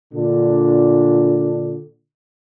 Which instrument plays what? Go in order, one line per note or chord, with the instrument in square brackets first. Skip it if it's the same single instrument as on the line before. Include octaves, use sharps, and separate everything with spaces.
[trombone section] A#2 D3 D4